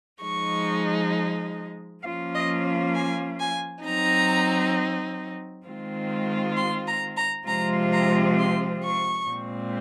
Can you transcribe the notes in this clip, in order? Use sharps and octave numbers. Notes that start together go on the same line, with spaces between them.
F3 G#3 D#4 C#6
F3 A#3 C#4 F4 F5
D#5
G#5
G#5
F#3 C4 D#4 A#5
D#3 G#3 C4 F4
C6
A#5
A#5
C3 F3 G#3 C4 F4 A#5
A#5
C6
C#6
A#2 G#3 C4